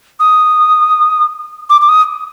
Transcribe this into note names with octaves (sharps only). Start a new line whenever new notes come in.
D#6
D6
D6
D#6